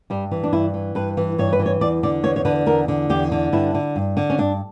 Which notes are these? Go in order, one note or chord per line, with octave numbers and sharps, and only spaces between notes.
G2 G3
E3
D4
G2 E4
E3
G2 B4
E3
G2 C#5
B4
E3
C#5
E2 D5
D3 D5
E2 C#5
C#5
D3 B4
E2 A#4
D3
E2 G4
D3
G2 E4
D3
G2
D3
C#4
G2 D4